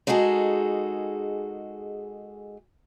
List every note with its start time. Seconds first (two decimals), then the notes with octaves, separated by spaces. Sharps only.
0.07 G#3 D#4 F#4 G#4 A4